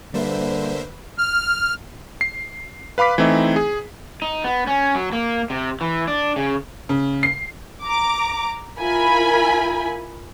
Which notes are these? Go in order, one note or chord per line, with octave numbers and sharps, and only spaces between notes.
D3 G3 A#3 B4 C5 E5
F6
C7
B4 F5 B5 D6 B6
E3 A3 C4 D#4 E4
G#4
D#4
B3
C#4
F#3
A#3
C3
E3
D4
C#3
C#3
C7
A#5 D6
E4 F4 A#4 G#5 B5